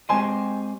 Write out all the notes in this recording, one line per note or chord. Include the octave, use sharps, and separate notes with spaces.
G#3 C4 G4 C5 D#5 G#5 C6